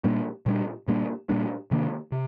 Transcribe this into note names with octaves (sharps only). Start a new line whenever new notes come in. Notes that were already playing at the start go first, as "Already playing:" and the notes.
A#2 G3 A#3 D4
A#2 G3 A#3 D4
A#2 G3 A#3 D4
A#2 G3 A#3 D4
C3 D#3 A#3 D4
C3